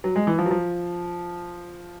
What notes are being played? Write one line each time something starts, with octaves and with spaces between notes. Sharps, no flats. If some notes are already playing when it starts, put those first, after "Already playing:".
F#3
G#3
E3
F3
F#3
F3